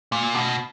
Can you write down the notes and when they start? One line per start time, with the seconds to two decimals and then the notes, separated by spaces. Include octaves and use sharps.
0.12 A#2
0.35 B2